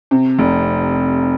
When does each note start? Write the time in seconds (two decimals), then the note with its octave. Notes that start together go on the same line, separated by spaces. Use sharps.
0.11 C3
0.39 F1